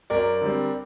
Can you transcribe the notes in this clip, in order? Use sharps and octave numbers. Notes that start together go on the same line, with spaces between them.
F#2 A#4 D5
D3 G3 C4